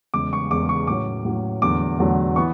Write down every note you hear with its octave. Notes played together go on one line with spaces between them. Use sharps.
E2 C#3 G#3 D6
C#6
E2 C#3 G#3 D6
C#6
A2 F#3 C#4 D6
A2 F#3 C#4
E2 D3 F#3 A3 D6
E2 D3 F#3 A3
E3 B3 C#6